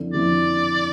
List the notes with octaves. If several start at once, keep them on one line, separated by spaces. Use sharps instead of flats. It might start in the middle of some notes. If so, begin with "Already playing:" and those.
Already playing: F2 D3 F3 C4 E4
F2 D3 F3 C4 E4 D5